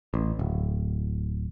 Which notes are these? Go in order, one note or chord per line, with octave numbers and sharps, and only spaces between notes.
A1
D1